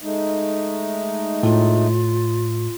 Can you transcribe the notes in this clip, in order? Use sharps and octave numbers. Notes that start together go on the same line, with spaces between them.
G#3 A3 D#4
A2 F4